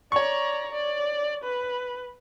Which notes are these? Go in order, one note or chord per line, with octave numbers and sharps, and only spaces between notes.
C#5 D5 A#5 C#6
D5
B4